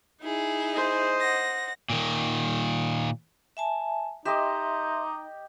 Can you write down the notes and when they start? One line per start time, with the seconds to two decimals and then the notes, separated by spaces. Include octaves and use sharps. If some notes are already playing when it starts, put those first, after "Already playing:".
0.23 D#4 E4 G#4
0.73 C5 D#5
1.21 F#5 A#6
1.90 A#2 D#3
3.57 E5 G#5 A5
4.25 D#4 G4 D#5 E5 C6 D6